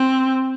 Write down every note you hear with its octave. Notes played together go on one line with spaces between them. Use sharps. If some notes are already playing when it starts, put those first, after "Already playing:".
Already playing: C4